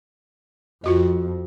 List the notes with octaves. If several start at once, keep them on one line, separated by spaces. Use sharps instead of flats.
F2 F4 F#4 D#5